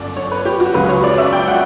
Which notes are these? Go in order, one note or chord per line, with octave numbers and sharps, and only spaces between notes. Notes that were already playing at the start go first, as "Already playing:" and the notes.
Already playing: G1 F#2 D3 D5
C#5
B4
G4
F#4
C#2 C#3 F#3 B4
C#5
D5
E5
G5
F#5